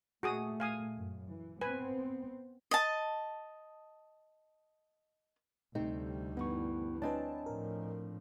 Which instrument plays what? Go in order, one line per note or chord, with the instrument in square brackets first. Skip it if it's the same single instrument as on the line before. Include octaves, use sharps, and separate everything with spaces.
[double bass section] A#2 A3 [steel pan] F#4 G#4 D#6
[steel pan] F5 G#5 D#6
[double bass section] F#2
E3
[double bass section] B3 C4 [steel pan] B4 G#5
[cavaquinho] D#5 A5
[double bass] D2 G3 [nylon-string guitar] C3 A3 C4 [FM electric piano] D#4
[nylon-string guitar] G2 E3 [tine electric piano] B3 C#6
[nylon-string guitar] C4 D4 [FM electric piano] B4 A5 [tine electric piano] C#5 D#5 G#5
[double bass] A2 F3 [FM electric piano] A#4